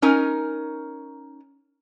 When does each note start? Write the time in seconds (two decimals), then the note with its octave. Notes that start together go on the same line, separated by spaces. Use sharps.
0.02 C#4 D#4 A#4 G#5